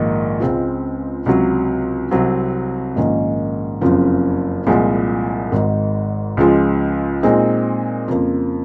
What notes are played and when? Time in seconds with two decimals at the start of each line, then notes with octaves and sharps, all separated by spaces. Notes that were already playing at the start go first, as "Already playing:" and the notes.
Already playing: A#1 G#2 D#3 A#3
0.40 C#2 C#3 G#3 C4 F4
1.26 C#2 C3 F#3
2.11 C2 C3 F#3 C4
2.96 A#1 G#2 D#3 A#3 C#4
3.81 F#1 F2 C#3 F3
4.67 C2 A#2 F3 G#3
5.52 G#1 G#2 D#3
6.37 C#2 C#3 F3 G#3
7.23 A#2 G#3 C4 D#4
8.08 F2 C#3 F3 A#3